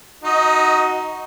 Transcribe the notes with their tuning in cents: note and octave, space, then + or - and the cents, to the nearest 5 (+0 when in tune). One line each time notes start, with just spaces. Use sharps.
D#4 +0 F#4 +0 D#5 +25